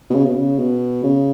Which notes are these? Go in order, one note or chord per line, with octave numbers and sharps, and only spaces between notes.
B2
C#3
B2
C#3
B2
C#3